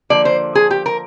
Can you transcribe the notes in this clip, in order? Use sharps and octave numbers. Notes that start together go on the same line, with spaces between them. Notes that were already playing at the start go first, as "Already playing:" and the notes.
D3 F3 A#3 D5
C5
G#4
G4
A#4